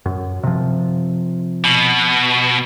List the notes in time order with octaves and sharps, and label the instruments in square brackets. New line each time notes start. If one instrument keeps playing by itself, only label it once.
[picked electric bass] F#2
C3 F3
[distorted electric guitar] B2